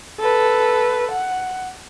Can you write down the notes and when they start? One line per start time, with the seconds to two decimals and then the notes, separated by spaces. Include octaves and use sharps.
0.20 A4 B4
1.12 F#5